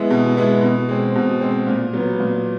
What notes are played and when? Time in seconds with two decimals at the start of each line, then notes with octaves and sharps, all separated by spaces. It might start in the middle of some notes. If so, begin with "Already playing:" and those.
Already playing: G#3 B3 E4
0.10 B2
0.37 G#3 B3 E4
0.62 B2
0.89 G#3 C4
1.15 B2
1.41 G#3 C4
1.67 A#2
1.93 F#3 B3
2.20 A#2